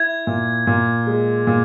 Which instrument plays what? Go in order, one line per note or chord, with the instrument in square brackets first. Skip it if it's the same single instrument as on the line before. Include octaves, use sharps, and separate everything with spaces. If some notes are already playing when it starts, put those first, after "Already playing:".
Already playing: [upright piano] E4 [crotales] G#6
[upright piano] A#2
A#2
G#3
A#2